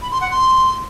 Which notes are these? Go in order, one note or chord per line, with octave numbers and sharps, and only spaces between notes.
B5
C6
F#5
C6